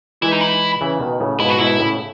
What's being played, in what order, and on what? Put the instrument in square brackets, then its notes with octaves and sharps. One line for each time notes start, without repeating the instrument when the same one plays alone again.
[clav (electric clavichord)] E3 G#3 [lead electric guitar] E4
[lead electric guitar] D#4
E4
[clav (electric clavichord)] C#3 E3
B2 D#3
A2 C#3
[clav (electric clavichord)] G#2 B2 [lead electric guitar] E4
[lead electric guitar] F#4
[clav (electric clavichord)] G#2 B2 [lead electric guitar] E4
[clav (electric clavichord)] A2 C#3